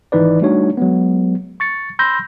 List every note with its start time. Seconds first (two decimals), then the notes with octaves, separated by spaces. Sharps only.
0.12 G#1 E3 D#4 B4 D5
0.41 G3 A3 D4 D#4 F#4 C#5
0.77 F#3 G#3 B3
1.60 C#6 A6 C#7
1.99 B5 C6 E6 G6 A#6